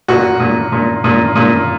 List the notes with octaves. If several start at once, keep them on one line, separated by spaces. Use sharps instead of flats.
A#2 F#4
A#2
A#2
A#2
A#2